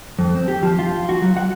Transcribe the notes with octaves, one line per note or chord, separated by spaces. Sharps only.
F2
C4
G4
F3
F4
F#4
F#3
F#5